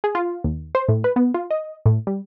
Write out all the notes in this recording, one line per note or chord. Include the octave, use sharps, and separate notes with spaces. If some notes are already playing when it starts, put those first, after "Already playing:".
G#4
F4
D#2
C5
A2
B4
B3
F4
D#5
A2
G3